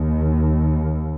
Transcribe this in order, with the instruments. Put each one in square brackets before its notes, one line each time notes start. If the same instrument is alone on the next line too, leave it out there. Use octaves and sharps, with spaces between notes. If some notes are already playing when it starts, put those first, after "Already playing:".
Already playing: [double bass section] D#2 D#3